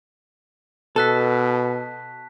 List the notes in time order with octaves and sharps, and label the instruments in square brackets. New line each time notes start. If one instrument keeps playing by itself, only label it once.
[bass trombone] B2 [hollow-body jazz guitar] A4 [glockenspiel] A5 F#6 B6